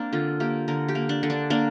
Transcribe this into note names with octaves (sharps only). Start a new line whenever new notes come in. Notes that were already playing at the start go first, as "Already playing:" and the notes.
Already playing: A#3 C4 D4
D3 F4
A#3 G4
D3 A#4
G4
A#3
D4
D3
D4
A#3 D4